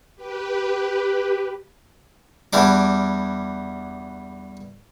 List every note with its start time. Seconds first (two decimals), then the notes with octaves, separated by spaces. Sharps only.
0.16 G4 B4
2.53 E2 E3 G3 D4 D6